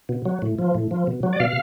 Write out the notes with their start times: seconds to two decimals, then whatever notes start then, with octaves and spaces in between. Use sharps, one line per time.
0.09 B2
0.25 F#3
0.42 A2
0.59 F3
0.75 A2
0.91 F3
1.07 B2
1.23 F#3
1.33 D5
1.40 B2 F5